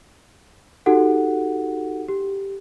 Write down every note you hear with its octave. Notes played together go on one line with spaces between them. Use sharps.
D#4 F#4 G4 A4 F#5
G4